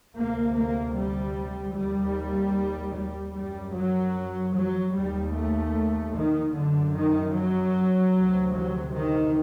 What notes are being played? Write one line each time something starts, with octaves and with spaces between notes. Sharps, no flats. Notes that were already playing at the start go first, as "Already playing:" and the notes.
D2 C3 A#3
A#3
G3
D#2 G3
G3
F#2 G3
F#3
F#3
D#2 G3
A3
D#3
F#2 D3
D#3
F#3
D2 C3
F#3
D#3